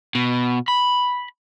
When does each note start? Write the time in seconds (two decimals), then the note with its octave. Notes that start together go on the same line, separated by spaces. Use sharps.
0.15 B2
0.68 B5